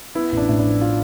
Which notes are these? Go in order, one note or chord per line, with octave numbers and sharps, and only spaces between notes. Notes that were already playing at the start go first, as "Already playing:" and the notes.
B3 E4
A1
D4
A2
D4
F3
B3 F4